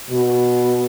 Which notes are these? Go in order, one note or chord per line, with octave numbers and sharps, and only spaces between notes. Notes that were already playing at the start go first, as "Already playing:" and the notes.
B2